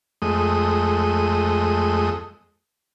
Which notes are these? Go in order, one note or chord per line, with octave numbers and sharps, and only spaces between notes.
F2 G#3 A3 D#6